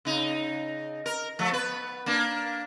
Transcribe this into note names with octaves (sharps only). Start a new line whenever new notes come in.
C#3 D#4
A#4
F3 A3
B3 B4
A#3 D4